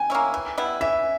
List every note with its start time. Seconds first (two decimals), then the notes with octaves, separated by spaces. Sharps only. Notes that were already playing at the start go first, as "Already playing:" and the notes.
Already playing: G5 G#5
0.10 A#3 C#4 E4
0.34 E3
0.58 G3 B3 E4
0.81 E3 E5